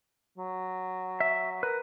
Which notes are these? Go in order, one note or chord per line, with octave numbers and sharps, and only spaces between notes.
F#3
E5
A#4 B4